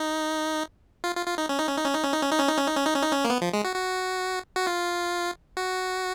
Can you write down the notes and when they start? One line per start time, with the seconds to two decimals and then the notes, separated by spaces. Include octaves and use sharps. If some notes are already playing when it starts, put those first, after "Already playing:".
Already playing: D#4
1.04 F4
1.15 F4
1.26 F4
1.38 D#4
1.49 C#4
1.58 D#4
1.68 C#4
1.77 D#4
1.85 C#4
1.94 D#4
2.04 C#4
2.13 D#4
2.21 C#4
2.31 D#4
2.40 C#4
2.49 D#4
2.58 C#4
2.67 D#4
2.76 C#4
2.85 D#4
2.94 C#4
3.03 D#4
3.12 C#4
3.25 A#3
3.30 B3
3.41 F3
3.53 G#3
3.64 F#4
3.76 F#4
4.56 F#4
4.67 F4
5.57 F#4